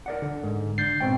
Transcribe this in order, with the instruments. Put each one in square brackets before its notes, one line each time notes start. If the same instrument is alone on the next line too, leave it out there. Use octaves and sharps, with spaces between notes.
[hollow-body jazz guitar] A#4 D5 F#5
[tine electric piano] D3
[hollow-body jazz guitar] G#2
[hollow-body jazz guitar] D3 [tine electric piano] G6 A6 C7
[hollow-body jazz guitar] G#2 B2 C4 [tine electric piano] G5